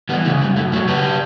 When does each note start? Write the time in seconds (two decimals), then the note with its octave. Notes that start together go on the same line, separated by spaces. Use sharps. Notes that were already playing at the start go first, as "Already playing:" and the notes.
0.09 E3 G3 B3
0.25 C#3 A3
0.40 F#2 G3
0.56 F#2 A3
0.72 F#3 A3 C#4
0.87 C#3 G4 B4